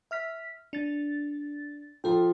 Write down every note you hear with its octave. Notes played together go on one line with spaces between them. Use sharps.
E5 F6 B6
D4 A6
F3 F4 A4 G5